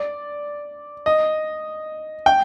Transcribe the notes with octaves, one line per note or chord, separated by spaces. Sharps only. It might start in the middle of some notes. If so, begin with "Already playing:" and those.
Already playing: D5
D#5
G5